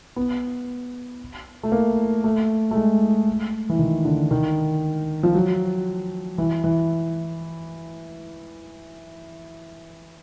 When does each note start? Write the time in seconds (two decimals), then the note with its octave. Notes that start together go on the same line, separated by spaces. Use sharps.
0.16 B3
1.63 A3
1.72 A#3
2.24 A3
2.71 A3
2.75 G#3
3.69 E3
3.79 D#3
4.05 D3
4.31 D#3
5.23 F3
5.35 F#3
6.38 E3
6.64 E3